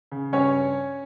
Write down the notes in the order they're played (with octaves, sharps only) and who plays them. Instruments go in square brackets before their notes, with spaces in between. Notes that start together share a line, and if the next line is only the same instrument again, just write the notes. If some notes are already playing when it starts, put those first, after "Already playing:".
[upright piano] C#3
G2 C#4 C#5